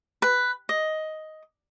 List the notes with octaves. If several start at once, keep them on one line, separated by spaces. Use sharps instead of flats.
B4
D#5